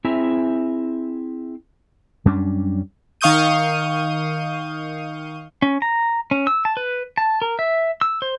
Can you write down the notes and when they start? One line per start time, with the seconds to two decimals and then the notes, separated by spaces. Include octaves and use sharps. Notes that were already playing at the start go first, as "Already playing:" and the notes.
0.05 C4 E4 G#4 E5 G#5 A#5
2.25 F#2 G3 C#4 D4
3.21 D#3 F5 C#6 D#6 G6 D#7
5.62 C#4
5.82 A#5
6.31 C#4
6.47 E6
6.65 A5
6.77 B4
7.17 A5
7.42 A#4
7.59 E5
8.01 E6
8.22 C5